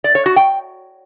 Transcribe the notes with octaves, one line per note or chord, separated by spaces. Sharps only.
D5
C#5
F#4
G5